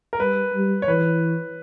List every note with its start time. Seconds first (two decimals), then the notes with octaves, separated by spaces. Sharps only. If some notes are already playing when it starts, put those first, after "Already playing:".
0.13 A#4
0.20 G3 B4
0.54 G3
0.82 C#5
0.88 E3 B4